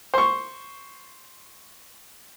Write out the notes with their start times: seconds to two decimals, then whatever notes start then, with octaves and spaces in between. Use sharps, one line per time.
0.14 C5 C#6